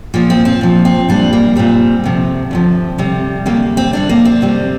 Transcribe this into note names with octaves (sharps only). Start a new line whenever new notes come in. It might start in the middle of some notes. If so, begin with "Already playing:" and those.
A#2 F3 A#3
C4
C4
A#2 F3
C4
A#2 G3 D4
A#3
A#2 G3 C4
D2 C3 F3
D2 C3 F3
D2 C3 G3
D2 C3 G3 A#3
C4
D2 C3 G3 D4
A#3
C4
D2 C3 G3